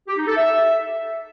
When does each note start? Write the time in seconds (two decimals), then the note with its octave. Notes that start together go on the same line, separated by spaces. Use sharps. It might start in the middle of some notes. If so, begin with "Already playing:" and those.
0.08 G4
0.17 D#4
0.27 A4
0.37 E5